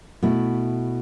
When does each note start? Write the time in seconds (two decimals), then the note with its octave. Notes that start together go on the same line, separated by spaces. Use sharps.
0.22 B2 A3 E4